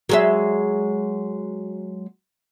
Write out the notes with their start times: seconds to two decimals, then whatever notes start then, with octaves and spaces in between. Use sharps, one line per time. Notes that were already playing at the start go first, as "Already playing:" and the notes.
0.09 F#3 G#3 E5